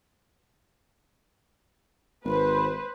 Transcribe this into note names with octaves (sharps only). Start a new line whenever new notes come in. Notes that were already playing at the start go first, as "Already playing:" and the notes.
G#1 B4 C5